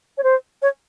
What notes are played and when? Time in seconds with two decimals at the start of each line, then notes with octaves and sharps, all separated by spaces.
0.18 C#5
0.23 C5
0.62 C#5